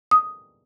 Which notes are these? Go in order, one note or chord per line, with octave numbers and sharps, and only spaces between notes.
D#6